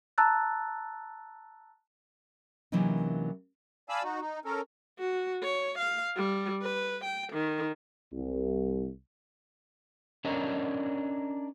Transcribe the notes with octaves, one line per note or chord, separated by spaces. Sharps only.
A5 A#5 E6 F#6 A6
C3 E3 F#3 A#3 C#4 D#4
D5 F5 G#5 A5 B5 E6
D#4 F#4
D#4
C#4 A4 A#4
F#4
C#5
F5
G3
B4
G5
D#3
C2
C#4 D4 A4 A#4 C#5 D#5